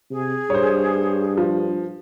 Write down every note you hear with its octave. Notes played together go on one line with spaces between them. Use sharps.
C3 G#4
G2 C5 C#5
F3